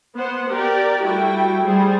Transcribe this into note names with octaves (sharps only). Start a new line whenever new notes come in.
B3 C5 F#5
G4 A#4 D5
G3 A3 E4 F#4 G5
G3 G#4 C5